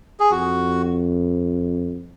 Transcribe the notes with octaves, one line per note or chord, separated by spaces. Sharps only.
G#4
F2 F#4